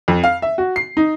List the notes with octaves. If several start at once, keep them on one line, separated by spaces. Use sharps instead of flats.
F2
F5
E5
F#4
C7
D#4